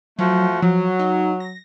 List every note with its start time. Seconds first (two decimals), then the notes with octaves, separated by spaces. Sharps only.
0.19 F3 F#3 A3 F#4
0.62 F3 F#3
0.99 D#4
1.40 A#6